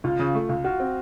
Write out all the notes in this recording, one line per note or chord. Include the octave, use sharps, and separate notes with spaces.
C#2 F4
C#3
A3
C#2
F4 F#4
C4